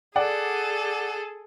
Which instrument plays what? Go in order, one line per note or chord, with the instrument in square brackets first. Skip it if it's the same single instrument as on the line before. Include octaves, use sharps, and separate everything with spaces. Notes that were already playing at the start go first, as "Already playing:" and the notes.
[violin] G#4 A4 [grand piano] D5 F#5